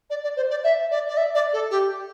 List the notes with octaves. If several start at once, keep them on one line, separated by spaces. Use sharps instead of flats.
D5
D5
C5
D5
E5
D5
D5
E5
D5
A4
G4